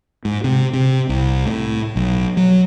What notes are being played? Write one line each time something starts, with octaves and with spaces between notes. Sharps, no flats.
G#2
C3
C3
C2
A2
B1
F#3